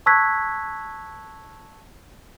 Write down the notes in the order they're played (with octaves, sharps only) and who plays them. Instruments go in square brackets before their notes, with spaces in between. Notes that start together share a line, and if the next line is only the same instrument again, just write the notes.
[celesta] A5 C#6 E6 F#6 G#6 B6